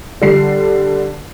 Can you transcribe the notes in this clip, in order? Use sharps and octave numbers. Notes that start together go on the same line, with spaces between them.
D3 G3 C7